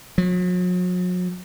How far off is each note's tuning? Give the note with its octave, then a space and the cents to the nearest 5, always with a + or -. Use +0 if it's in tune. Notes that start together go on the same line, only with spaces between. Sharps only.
F#3 -40